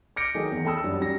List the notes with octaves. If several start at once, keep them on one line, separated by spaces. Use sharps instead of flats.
D6 F6 G6 A#6 C#7 D7
D#3 F#3 A3 D#4 G#4
E2
A3 G5 A5 B5 D#6 E6
F#2 G3 D4
F#3 G3 C#4 A#6